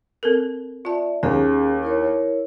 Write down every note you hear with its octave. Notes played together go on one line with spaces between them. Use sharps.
C4 A4 A#4
F4 D5 E5 A5
D#2 C#4 G#4 G#5
E4 A#4 C#5